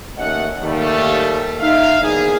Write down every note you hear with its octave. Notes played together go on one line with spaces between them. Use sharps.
D#2 A3 C#4 D#5 F#5
D#2 D#3 G3 A3
D#4 E5 F5
E2 G#2 B2 A#3 G#4